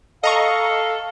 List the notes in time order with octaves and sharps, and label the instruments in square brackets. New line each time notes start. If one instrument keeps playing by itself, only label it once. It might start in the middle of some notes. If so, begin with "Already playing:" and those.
[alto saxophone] A4 [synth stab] D#5 A#5 C#6 [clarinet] F5